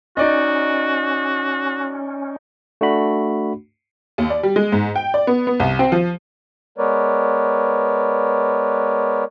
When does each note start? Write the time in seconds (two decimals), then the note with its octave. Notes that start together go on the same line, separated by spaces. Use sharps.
0.17 C#4 D#4 F#4 D5 D#5
2.81 A3 D4 F#4 B5
4.18 D#2
4.30 D5
4.43 G3
4.56 G#3
4.72 G#2
4.96 G5
5.14 D5
5.27 B3
5.47 B3
5.60 C2
5.79 C4
5.92 F3
6.78 G#3 B3 A#4 B4 C#5 D5